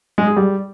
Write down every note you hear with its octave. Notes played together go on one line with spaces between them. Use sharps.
G#3
G#4
G3